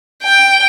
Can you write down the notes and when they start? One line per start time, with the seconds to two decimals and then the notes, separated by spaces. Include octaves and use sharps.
0.24 G5